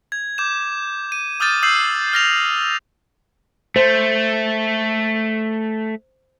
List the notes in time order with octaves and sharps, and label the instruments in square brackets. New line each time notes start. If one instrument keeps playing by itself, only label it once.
[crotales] G#6
D6 G6 E7
D#7
D6 D#6 F6 G6 A6 D#7
D#6 E6 G6 C7 F#7
F6 A#6 F7
[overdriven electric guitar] A3 [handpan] C5